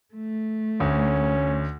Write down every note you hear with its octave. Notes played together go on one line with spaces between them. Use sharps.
A3
D2 C#4